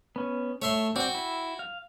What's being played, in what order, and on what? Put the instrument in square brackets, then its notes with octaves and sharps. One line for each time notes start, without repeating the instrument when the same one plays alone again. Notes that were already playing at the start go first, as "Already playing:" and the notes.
[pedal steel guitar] B3 C#4
[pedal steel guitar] A3 [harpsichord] C#5 E5 C6
[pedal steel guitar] C4 D5 [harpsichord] F#4 G5
[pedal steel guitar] E4
F5